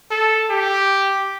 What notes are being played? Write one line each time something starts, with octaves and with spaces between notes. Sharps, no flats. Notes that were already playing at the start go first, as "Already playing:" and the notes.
A4
G4